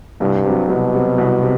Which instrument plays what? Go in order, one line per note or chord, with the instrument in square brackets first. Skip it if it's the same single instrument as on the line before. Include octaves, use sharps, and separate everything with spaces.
[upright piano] C2 [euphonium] G2
[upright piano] C3 F#3
[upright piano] C2 [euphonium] B2
[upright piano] C3 F#3
C2
C3